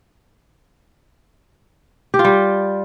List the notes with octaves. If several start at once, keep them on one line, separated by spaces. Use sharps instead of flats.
G4
F4
G3